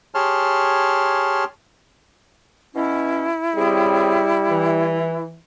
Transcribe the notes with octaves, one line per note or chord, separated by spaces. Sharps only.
G4 G#4 C#5 A5 C6 F6
B2 C#4 E4
C#3 G3 C4 G#4
E3